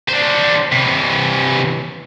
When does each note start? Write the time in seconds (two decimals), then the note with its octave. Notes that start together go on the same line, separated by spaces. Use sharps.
0.09 D4 C5
0.72 C3 E3